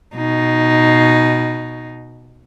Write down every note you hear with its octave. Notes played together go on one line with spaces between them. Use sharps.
B2 D#4